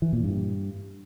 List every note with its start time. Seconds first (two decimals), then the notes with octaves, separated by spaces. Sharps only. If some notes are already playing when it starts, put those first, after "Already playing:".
0.02 E3
0.13 A#2
0.24 G2